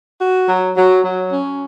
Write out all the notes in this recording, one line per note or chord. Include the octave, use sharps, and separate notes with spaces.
F#4
F#3
F#3
F#3
C#4